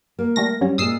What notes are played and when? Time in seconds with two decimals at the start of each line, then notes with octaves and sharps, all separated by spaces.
0.19 A#3
0.36 G3 A3 A#6
0.61 F#3 G3 C#4
0.78 A#2 G#3 D#6 E6 C7